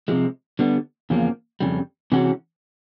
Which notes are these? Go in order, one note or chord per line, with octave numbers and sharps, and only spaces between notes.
C3 F3 G#3
D3 G3 B3
E2 C#3 F3 A#3
F2 C#3 G3
C3 E3 G#3 C#4 F#4